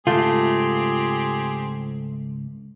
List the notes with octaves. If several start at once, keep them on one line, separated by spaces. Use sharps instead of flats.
C#2 G#2 A3 C4 F4 G4 G#4